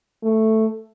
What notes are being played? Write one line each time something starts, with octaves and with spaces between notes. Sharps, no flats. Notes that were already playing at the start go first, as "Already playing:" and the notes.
A3